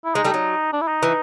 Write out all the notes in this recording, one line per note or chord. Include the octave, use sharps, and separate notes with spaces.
E4
G#3 D#4
G3 A3
F#3 D#4
D4
E4
D#4
E3